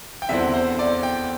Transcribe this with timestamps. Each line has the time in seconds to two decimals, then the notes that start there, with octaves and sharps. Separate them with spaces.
0.22 G5
0.29 E2 D3 C4 E4 E5
0.54 C5
0.79 D5
1.03 G5